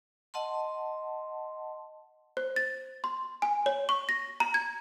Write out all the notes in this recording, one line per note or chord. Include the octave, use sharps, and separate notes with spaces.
D#5 F#5 A5 C6
C5
A6
C6
G#5
C#5
C#6
A#6
A#5
G#6